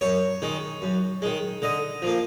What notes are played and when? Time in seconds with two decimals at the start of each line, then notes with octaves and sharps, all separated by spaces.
0.01 F#2 C#5
0.42 D#3 G#3
0.82 F#2
1.22 D#3 G#3
1.62 D3 D#5
2.02 F3 A#3